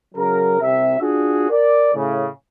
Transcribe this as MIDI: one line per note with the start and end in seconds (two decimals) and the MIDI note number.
0.15 0.60 49
0.15 0.60 54
0.15 0.60 70
0.60 0.96 36
0.60 0.96 48
0.60 0.96 76
1.00 1.48 62
1.00 1.48 65
1.00 1.48 66
1.00 1.48 68
1.50 1.90 70
1.50 1.90 74
1.94 2.28 45
1.94 2.28 49